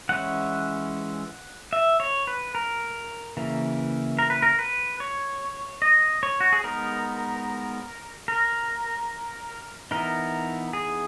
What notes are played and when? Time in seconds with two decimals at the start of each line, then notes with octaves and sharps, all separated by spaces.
0.09 E3 G#3 C#4 E4 F#5
1.73 E5
2.00 C#5
2.27 B4
2.55 A#4
3.37 C#3 E3 A#3
4.19 A#4
4.30 B4
4.42 A#4
4.59 B4
5.00 C#5
5.82 D#5
6.23 C#5
6.40 F#4
6.53 G#4
6.64 G#3 B3 D#4 A#4
8.28 A#4
9.91 E3 B3 D#4 A#4
10.73 G#4